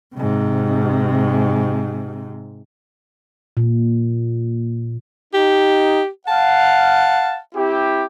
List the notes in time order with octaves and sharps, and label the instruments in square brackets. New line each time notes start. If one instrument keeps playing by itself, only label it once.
[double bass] G#2 C3
[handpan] A#2
[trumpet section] D#4 [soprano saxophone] G4
[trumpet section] F5 F#5 [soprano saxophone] A5
[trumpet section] C4 E4 G4